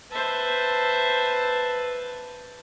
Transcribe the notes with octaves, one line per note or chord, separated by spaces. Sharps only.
B4 C5 E5 A5